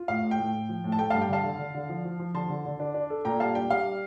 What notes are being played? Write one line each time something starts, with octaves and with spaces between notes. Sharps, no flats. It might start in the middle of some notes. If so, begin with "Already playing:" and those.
Already playing: F4
A2 F5
A2
G5
A2
A2
F3
A2
A5
A3 G5
G2 F5 A5
G5
D3 F5 A5
D3
D3
D3
F3
F3
F3
D3 A5 C6
D3
D3
D4
D4
A4
A#2 G5 A#5
G3 F5 A5
D4 G5
G3 F5